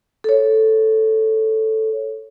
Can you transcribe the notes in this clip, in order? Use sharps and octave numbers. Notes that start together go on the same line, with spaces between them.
A4 C#5